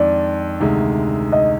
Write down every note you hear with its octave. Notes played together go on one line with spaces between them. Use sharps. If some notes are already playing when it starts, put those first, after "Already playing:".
Already playing: F2 D#3 G#3 D4 D5
D2 C3 D#3 G#3
D#5